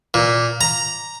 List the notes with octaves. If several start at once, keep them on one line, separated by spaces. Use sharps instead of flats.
A#2
A#5